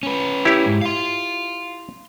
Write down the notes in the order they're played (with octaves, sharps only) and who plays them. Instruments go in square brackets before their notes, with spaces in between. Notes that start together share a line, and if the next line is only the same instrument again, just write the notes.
[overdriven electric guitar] C#4 B4
[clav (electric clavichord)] E4 G4 C#5
[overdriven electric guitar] G#2
F5 C6